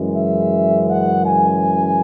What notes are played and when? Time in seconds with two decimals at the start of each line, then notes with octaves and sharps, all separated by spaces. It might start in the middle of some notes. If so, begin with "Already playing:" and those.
Already playing: F#2 C#3 E3 G#3
0.16 E5
0.90 F#5
1.26 G#5